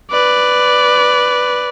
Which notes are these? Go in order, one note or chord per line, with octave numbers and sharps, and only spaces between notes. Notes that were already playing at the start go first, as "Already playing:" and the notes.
B4 D5